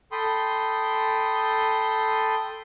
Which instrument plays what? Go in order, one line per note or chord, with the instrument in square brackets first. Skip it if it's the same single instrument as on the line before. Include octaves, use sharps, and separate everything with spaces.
[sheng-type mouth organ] A4 G5 B5 C6 D#6